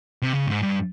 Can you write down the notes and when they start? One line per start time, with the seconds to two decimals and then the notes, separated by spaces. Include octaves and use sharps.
0.22 C3
0.33 C#3
0.47 G#2
0.63 G2